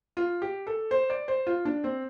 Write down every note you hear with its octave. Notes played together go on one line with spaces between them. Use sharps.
F4
G4
A4
C5
D5
C5
F4
D4
C4